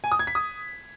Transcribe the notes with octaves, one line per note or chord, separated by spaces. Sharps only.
G#5
D#6
G#6
B6
D#6